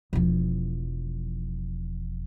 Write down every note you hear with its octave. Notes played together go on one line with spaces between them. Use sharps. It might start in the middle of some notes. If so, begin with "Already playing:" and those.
E1 F3